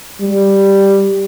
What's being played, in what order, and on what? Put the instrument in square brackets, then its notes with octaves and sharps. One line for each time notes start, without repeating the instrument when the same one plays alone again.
[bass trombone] G3